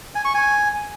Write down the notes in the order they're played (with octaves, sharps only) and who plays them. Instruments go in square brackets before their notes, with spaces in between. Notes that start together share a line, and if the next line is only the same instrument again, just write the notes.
[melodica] G#5
C#6
G#5